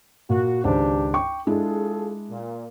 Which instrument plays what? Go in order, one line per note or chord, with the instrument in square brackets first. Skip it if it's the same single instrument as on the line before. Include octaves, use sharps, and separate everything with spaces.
[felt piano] A#2 [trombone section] F#4
[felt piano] G#1 C#2 C5 [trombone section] D4 G4
[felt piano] G5 C#6 D6
[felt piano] G#3 D4 E4 [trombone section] F4 G#4 A4
[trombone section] A#2